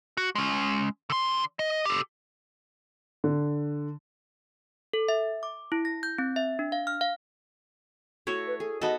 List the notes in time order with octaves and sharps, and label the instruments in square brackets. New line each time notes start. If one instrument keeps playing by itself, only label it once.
[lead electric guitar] F#4
G#3 C#4
D3 C6
D#5
G4 A4
[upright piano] D3
[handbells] A4
E5
D6
E4
A#6
G6
C4
E5
D4
F5
F6
F5
[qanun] A3 E4 F#4 [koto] C#5
[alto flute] B4
[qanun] G#4 [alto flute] A4
[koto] B3 A4 [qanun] D#4 F#4 [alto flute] D#5